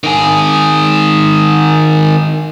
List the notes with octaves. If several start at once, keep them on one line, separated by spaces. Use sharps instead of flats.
D#3 G#4